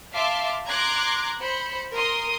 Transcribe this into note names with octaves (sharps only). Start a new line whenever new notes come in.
E5 F5 A5 C6 D6
A#5 C6 D6 F#6 G#6
C5 B5 C#7
A#4 C6 D#6